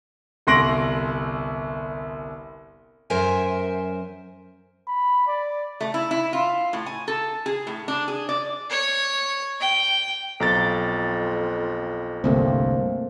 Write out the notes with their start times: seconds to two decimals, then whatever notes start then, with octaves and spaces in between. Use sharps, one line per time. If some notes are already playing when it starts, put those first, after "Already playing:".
0.47 G1 C2 C6 A#6 D7 F#7
3.10 F#2 A#4 C5 E5 G#5
4.88 B5
5.27 D5
5.81 A3
5.94 E4
6.11 E4
6.33 F4
6.73 A2
6.86 G#5
7.08 A4
7.46 G#4
7.67 A2
7.88 D4
8.08 G#4
8.29 D5
8.70 C#5
9.60 G5
10.40 B1 F2 A#5 A6
12.24 G1 C2 G2 A3 A#3 C4